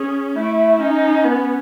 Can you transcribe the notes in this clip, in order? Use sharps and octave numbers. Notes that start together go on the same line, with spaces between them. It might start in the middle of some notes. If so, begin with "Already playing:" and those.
Already playing: C#4 G#4
A3 E4
C#4 D#4
B3